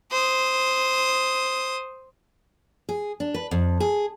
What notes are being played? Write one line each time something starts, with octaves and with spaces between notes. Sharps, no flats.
C5 D#6
G#4
D4
B4
F2
G#4